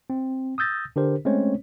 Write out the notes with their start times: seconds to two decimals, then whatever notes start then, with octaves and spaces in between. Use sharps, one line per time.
0.10 C4
0.58 D#6 E6 G6 A6 A#6
0.96 D3 D4 G4 A#4 C5
1.25 G#3 A3 C4 C#4 C5 C#5